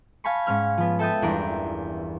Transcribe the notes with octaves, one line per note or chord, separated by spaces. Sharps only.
F5 G#5 A5 B5 C#6
G#2 C#4 F6 G#6
F3 B3
A4 E5 G5 A5 D#6
G1 E2 E3 D4 A#4 D7